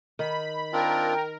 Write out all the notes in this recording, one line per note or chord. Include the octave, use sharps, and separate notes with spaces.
D#3 B5
C4 D4 F4 A#4 G5